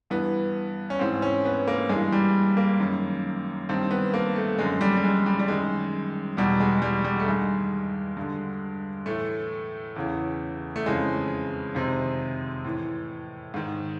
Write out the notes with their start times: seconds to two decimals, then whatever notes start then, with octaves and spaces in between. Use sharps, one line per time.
0.10 G2 E3 B3
0.90 C#4
0.99 G#2 E3 C4
1.22 C#4
1.45 B3
1.67 A#3
1.89 G2 E3 G#3
2.12 G3
2.57 A#3
2.80 F#2 D#3
3.69 G2 D#3 C4
3.91 B3
4.14 A#3
4.36 A3
4.58 F#2 D3 G#3
4.81 G3
4.97 G3
5.04 G#3
5.26 G3
5.39 G3
5.48 F#2 D#3 G#3
6.37 E2 B2 G3
6.60 G#3
6.82 G3
7.04 G3
7.20 A3
7.27 G2 D#3 G#3
8.17 G2 D3
9.06 A2 E3 A3
9.96 E2 C#3 E3
10.76 A3
10.85 F2 C#3 E3 G#3
11.75 F2 C3 D#3
12.64 A2 E3
13.54 G#2 D#3